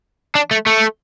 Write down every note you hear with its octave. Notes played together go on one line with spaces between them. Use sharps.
D4
A3
A3